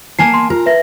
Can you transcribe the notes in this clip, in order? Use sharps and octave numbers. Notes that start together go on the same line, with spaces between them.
A#3 G#5 A5 C7
C6
F4 A#4
B4 E5 A#6